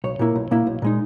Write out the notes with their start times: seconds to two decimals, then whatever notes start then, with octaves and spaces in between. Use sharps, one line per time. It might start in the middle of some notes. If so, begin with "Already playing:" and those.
0.04 B1 C#5
0.19 A#2 A#3 E4
0.35 B1
0.51 A#2 A#3 E4
0.67 B1
0.82 A#2 G#3 D#4